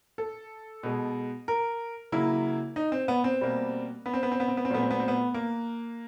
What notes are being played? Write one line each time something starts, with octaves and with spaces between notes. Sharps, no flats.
A4
B2 G#3
A#4
C#3 F#3 A#3 E4
D#4
C4
B3
C4
B2 G3 A#3
B3
C4
B3
C4
B3
C4
B3
C4
A#2 F#3 A3 B3
C4
B3
C4
B3
A#3